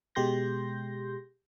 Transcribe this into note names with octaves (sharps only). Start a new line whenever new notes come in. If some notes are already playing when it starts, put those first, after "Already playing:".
B2 G#3 G4 C6 G6 A#6